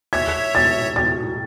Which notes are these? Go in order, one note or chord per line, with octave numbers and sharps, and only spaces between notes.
C#5 E5 G#6
A6
A6